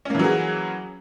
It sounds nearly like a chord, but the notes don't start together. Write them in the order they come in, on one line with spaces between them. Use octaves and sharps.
C#4 A#3 E3 F#3 G#4